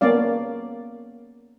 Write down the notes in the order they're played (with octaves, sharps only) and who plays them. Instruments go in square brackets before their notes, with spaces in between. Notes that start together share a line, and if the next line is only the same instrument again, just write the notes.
[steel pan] A#3 B3 C#4 D5 F5